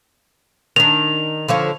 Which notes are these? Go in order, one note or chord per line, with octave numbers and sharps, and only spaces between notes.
D#3 D4 F7
D3 F3 C#5